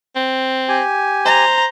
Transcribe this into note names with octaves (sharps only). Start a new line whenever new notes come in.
C4
G4 G#5
C5 A#5